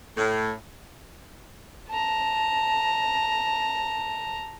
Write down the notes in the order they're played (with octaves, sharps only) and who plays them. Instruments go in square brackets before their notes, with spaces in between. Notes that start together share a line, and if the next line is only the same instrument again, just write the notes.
[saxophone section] A2
[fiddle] A5 A#5